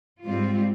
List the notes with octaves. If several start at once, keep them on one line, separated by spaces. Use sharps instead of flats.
G#2 G3 C4 F4